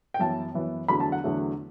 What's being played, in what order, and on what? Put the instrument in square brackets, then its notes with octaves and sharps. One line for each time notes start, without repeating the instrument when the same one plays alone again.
[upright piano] G5
F#2 E3 B3 A5
F#2 E3 B3
E2 D3 F#3 A3 B5
A5
F#5
E2 D3 F#3 A3